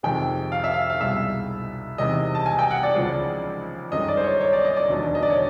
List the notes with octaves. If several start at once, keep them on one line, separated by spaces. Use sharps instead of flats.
F2 C3 D#3 G#3 G5
F5
E5
F5
F5
C2 B2 G#3 E5
E2 C3 D#3 G#3 D#5
A5
G#5
G5
F#5
D5
C#2 C#3 F3 G#3
G1 F#2 D#3 G#3 D#5
D5
C5
C#5
C#5
D5
D#5
D5
E1 D#2 D3 F#3
D#5
D5
C#5